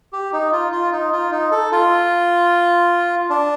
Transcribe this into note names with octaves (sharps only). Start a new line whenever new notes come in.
G4
D#4
F4
F4
D#4
F4
D#4
A4
F4
D4